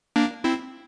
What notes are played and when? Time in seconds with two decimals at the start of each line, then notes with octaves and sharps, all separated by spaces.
0.16 A#3 D4
0.44 C4 E4